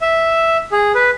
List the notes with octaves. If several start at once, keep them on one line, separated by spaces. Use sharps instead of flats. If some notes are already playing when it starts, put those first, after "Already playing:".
E5
G#4
B4